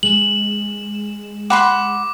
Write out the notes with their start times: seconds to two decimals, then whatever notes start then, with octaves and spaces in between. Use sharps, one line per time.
0.03 G#3 E7 F#7
1.50 F#5 B5 C6 D6